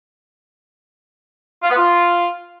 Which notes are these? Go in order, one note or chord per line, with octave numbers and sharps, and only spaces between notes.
F4
B3
F4